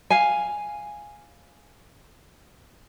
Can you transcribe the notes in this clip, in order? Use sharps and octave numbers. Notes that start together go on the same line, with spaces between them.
F5 G#5